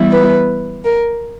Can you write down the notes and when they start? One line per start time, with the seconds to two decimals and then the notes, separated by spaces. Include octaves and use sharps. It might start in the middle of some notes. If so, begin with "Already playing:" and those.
Already playing: E3 G3 B3 E4
0.11 B4
0.84 A#4